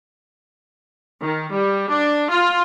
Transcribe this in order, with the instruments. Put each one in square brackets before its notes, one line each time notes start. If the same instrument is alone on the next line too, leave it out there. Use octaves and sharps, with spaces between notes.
[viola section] D#3
G3
D4
F4